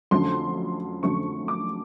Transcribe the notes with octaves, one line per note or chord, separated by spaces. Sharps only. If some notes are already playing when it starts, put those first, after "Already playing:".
F2 D3 F#3 A3 C#4 C6
F2 D3 F#3 A3 C#4 C#6
D6